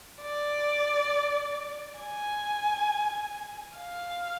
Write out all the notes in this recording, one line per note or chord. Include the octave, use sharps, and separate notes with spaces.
D5
G#5
F5